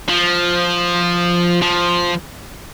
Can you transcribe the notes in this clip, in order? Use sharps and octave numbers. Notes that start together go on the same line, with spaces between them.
F3
F3